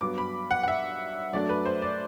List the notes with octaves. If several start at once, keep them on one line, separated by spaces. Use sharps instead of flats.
G2 F#3 B3 D6
B5
F#5
F#5
E5
F#2 F#3 A3 D4 D5
B4
C5
D5